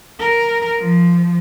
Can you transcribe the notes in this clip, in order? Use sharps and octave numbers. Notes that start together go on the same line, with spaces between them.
A#4
F3